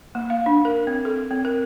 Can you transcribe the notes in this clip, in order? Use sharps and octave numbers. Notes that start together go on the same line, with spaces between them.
A#3
F5
D4
A#4
C4
A4
C4
A#4